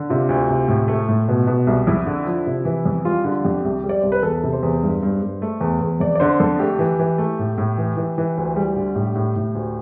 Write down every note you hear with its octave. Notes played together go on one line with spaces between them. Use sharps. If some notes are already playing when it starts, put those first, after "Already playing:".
Already playing: D3
C3 F4
D2
C3
A2
A3
A2
B2
B2
C2
F2 E4
D3
F3
C3
E3
F2
G3 F4
D3 F4
F2 G4
C2
G3
D5
C2 C5
B4
E2 A4
C3
C5
E2
G2
G2
G2
A3
E2
E2
F2 D5
D5
D3 C5
F2 A4
A3 G4
E3
E3
A3
A2
A2
E3
E3
E3
D2
G3
D3
A2 G4
A2
A2
D2